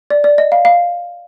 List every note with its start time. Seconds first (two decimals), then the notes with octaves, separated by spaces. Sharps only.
0.10 D5
0.24 D5
0.38 D#5
0.52 F5
0.65 F5